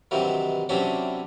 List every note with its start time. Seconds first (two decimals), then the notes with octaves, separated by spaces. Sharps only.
0.11 G2 C3 D#3 E3 F#3
0.69 C3 E3 F#3 C#4 D4 G4